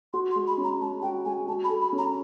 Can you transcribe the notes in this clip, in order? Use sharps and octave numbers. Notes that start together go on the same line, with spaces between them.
F#4 C6
C6
G#3
B5
C#4
A#5
G#3 A5
F#4 G5
G#3 G#5
F#4 A5
B5
A4
B5
C#4
A#5